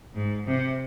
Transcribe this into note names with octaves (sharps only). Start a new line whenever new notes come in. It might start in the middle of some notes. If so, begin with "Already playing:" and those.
G#2
C3